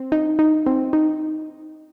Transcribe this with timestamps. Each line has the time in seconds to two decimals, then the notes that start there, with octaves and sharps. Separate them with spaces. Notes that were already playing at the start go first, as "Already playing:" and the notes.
Already playing: C4
0.12 D#4
0.39 D#4
0.66 C4
0.93 D#4